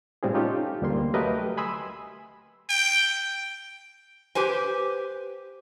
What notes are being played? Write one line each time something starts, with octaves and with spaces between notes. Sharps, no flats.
A2 G3 C4 F4 G#4
C#4 D#4 F4 G4 A4
D2 G3 A#3 C6
F#3 A3 G4 A#4 B4 D#5
G#5 B5 C6 D#6 E6
G5
G4 B4 C5 G#5